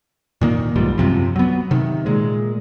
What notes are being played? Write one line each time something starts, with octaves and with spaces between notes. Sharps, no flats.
A#2 D#3 A#3
B1 G#2 F3 G3
F#2 C3 F3
F#3 B3
C3 D#3
A#2 G#3